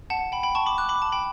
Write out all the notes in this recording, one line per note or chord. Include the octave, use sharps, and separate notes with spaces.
F#5 A5
G5 B5
G5 B5
A5 C#6
B5 D6
D6 F#6
B5 D6
A5
G5 B5